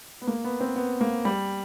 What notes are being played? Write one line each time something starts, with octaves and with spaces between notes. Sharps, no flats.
B3
A#3
B3
C4
B3
A#3
G3